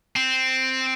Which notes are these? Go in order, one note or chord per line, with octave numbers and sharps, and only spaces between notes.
C4